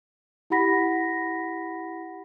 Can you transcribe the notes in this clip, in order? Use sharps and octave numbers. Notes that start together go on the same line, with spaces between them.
E4 G4 F#5 B5 A#6 B6